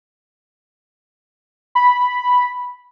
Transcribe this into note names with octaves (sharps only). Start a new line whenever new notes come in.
B5